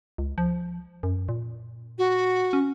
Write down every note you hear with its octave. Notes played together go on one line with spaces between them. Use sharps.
C#2
F3
F#2
A#2
F#4
C#4